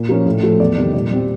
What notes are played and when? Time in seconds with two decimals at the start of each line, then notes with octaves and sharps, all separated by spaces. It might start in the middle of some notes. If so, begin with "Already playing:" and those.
Already playing: A#2
0.09 F3 A#3 C#4
0.26 A2
0.43 F3 A3
0.60 E2 D5
0.77 C3 D#3 G3
0.94 A#2 D5
1.11 G3 C4